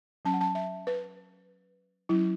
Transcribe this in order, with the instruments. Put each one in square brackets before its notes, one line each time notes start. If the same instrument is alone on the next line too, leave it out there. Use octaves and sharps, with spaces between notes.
[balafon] F#3 C#4 A5
F#5
A5
E5
B4
F#3 C#4 E4